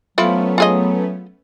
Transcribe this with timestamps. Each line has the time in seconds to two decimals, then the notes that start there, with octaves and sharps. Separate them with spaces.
0.18 F3 F#3 A3 B3 C#4 E4 F4
0.58 F4 G#4 D#5